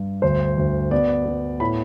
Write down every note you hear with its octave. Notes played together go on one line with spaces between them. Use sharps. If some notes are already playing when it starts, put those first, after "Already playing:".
Already playing: G2
D2 C5
D2
B3 D5
B3
A2 B5